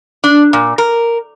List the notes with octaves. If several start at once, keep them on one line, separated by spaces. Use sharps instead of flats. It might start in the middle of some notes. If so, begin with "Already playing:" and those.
D4
A#2
A#4